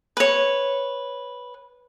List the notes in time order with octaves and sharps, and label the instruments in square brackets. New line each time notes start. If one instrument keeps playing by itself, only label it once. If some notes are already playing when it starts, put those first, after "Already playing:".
[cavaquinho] B4 C#5